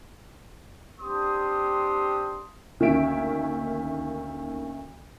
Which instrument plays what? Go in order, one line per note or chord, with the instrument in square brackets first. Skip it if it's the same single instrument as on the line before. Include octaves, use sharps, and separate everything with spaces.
[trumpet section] C4 D4 G4 C6 D#6
[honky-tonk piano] D2 D#3 A#3 C#4 E5 D7